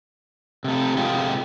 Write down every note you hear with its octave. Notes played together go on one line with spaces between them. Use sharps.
C3 A3
C3 G#3 A3 F4 G4